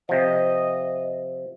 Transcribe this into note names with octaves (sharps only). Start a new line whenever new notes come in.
C3 F3 D#5